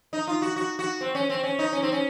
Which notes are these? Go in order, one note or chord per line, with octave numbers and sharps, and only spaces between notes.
D#4
F4
F#4
F#4
F#4
C4
C#4
C4
C#4
D#4
C#4
C4
C#4